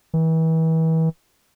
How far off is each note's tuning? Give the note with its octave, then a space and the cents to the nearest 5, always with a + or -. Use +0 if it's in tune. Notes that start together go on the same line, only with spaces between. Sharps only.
E3 -35